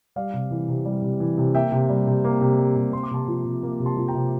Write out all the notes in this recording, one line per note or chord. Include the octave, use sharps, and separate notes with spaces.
G3 D5 F5
C3
E3
C3
G3
C3
E3
C3
A#3 E5 G5
C3
G3
C3
A#3
C3
G3
C3
A#3 C6
D6
C3 A5 C6
F3
C3
A#3
C3
A5 C6
F3
G5 A#5
C3